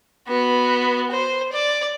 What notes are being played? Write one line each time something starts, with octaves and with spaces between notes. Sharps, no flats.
B3 F#4
C5
D5